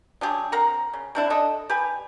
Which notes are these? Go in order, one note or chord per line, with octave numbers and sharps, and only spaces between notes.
F#3 D4 G4 G#4
C4 A#4 F#5 A#5
C#3
C3 D4 E4
D4 A4 D#5
G4 B4 G#5